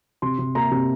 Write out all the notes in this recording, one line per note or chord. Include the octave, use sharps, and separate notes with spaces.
C3 C6
C3
A#3 A#5
C3